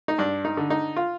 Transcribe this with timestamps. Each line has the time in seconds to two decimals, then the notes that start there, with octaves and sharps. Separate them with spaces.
0.08 D#4
0.18 G2 D4
0.45 D#4
0.57 D3
0.70 D#4
0.96 F4